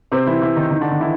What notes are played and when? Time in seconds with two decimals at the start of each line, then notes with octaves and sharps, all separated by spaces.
0.12 C3 C4
0.26 E3 E4
0.41 E3 E4
0.56 D#3 D#4
0.71 D#3 D#4
0.81 D3 D4
0.91 D#3 D#4
1.00 E3 E4